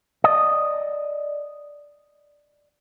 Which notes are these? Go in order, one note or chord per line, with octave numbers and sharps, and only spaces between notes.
D5 D#5